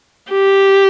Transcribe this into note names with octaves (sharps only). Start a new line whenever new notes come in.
G4